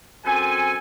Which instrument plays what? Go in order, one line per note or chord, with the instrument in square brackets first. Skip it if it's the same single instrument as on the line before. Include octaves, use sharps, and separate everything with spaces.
[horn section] F#2 C4 A4 G#5